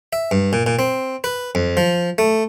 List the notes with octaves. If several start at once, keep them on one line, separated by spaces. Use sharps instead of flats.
E5
G2
A#2
A#2
C4
B4
F2
F3
A3